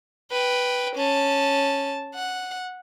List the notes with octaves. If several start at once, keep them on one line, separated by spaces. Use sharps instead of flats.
B4 G5
C#4 A5
F#5